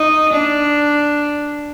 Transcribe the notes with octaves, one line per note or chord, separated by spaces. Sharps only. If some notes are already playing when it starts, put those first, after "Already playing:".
Already playing: D#4
D4